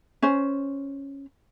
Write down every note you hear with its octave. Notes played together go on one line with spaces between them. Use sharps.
C#4 C5